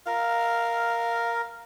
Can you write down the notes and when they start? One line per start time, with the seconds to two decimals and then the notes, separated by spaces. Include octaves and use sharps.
0.07 A#4 F5